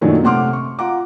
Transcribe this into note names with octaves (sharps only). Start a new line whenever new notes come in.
F#2 A#2 D#3 F#3 A3 D4
C3 A3 F#5 C6 D6 F6
C#6
F4 F#5 A#5 D6